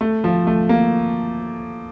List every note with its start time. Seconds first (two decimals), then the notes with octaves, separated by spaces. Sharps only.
0.01 A3
0.24 F3
0.47 A3
0.69 A#3